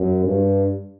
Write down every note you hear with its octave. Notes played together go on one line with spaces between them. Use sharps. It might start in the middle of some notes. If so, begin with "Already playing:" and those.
Already playing: F#2
G2